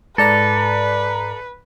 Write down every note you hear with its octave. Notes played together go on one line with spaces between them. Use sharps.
G#2 A4 B4 D5 A#5